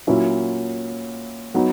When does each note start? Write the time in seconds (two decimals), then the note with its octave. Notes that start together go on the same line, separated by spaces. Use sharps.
0.07 A#2 F#3 C#4 E4
1.54 F#3 B3 D#4